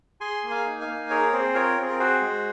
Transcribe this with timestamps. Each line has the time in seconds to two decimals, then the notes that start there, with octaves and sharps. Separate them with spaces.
0.21 G#4 G#5 C6
0.43 A#3
0.50 F5 G#5
0.66 D#4
0.81 F5 G#5
0.88 A#3
1.10 G#4 A#4 C#5
1.33 C4 G#4 C5
1.54 F4 A#4 C#5
1.78 C4 G#4
1.90 A#4
1.99 F#4 G#4 C5
2.21 G#3